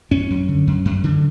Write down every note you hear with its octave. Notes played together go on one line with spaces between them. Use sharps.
F#2 C#4
F#2
D3
F#2
F#2
D3